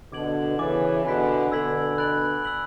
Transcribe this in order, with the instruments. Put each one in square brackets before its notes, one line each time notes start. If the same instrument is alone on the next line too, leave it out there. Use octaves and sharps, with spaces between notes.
[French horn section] B2 D3 [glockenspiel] D6 G#6 D7 F#7
[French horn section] C#3 E3 [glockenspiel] G#5 D6 A6
[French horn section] B2 D3 [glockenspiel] G#5 B5 F#6 B6 D7
[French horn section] B2 D3 [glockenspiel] E6 G#6 B6 F#7
[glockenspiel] B5 F#6 A6 D7 F#7
E6 B6 F#7